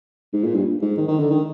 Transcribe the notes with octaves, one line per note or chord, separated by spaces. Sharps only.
G#2
A#2
G2
G#2
D#3
D#3
D3
D#3